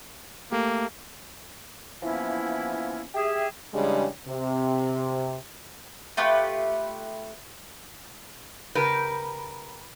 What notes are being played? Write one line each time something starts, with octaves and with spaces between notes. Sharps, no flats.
A3 A#3 G4
E3 F3 A#3 B3 C#4 E4
G4 G#4 E5
C#3 E3 G3 G#3 D4 G4
C3
A3 F4 G4 B4
C#3 G4 A#4 B4